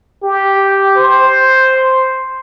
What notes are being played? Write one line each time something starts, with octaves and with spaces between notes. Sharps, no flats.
G4
C5